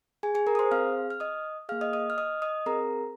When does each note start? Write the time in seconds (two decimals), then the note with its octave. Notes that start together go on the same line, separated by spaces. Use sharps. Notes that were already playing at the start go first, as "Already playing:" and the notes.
0.23 G#4 G#5
0.35 G#4 G#5
0.47 A#4 A#5
0.55 D#6
0.59 C5 C6
0.71 C4 G#4 F5 F6
1.10 F6
1.20 D#5 D#6
1.69 G#4 F5 F6
1.72 A#3
1.81 D#5 D#6
1.93 D#5 D#6
2.10 F6
2.18 D#5 D#6
2.42 D#5 D#6
2.66 C4 G#4 A#4 A#5